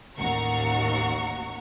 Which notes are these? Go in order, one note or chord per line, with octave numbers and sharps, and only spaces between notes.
A1 D#2 F#5 A#5 C#6